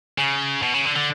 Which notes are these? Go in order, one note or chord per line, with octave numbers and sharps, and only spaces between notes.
C#3
B2
C#3
D3
D3